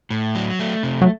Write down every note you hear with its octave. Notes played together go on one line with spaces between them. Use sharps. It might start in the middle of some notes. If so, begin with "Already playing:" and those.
A2
F#3
A3
C3
F#3